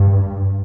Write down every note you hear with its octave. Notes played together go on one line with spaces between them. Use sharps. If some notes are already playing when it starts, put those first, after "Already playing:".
Already playing: G2